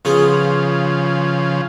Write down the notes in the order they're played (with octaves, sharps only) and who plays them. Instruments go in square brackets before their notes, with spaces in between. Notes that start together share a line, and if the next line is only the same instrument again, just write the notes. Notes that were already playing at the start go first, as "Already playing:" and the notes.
[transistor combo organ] C#3 F3 [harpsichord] B3 F4 G#4